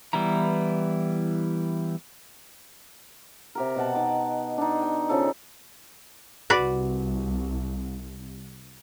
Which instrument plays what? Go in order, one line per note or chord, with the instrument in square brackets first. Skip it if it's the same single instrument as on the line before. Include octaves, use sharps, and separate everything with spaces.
[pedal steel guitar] E3 G3 B3 E4 A#5
[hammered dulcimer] C3 G4 A#4
B2 F#5 A5
D#4 D6
D4 D#4
G5
C#3 F3 A4
[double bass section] C2 [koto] F#4 B4 D5